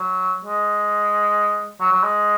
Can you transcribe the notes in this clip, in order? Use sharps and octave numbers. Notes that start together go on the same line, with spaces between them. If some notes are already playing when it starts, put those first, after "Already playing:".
Already playing: F#3
G#3
F#3
F#3
G#3